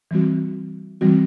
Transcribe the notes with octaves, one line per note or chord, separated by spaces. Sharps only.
E3 G3 C4 F#4
E3 G3 C4 F#4